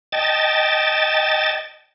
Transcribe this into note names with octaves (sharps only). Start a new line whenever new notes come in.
D#5 G5 A5 A6